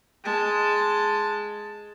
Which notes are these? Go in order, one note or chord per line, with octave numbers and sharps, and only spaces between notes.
G#3 A5